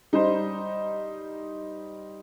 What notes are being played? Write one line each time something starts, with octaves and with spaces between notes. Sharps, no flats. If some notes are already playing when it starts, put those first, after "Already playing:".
G3 D#4 C5